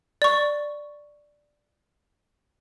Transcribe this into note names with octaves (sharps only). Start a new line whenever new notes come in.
D5 C#6